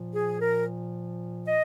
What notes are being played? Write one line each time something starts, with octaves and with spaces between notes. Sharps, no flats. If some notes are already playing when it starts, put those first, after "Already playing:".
Already playing: A#2 F3
G#4
A#4
D#5